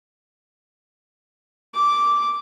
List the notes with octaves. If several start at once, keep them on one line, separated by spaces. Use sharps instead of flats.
D6